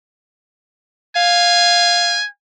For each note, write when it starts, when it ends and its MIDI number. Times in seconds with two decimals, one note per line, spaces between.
1.16 2.18 77
1.16 2.26 80